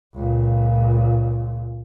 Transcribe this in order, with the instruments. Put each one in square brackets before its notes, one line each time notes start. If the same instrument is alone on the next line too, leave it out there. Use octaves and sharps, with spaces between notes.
[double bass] C#2 A#2